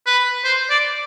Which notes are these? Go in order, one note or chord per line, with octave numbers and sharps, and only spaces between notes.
B4
C5
D5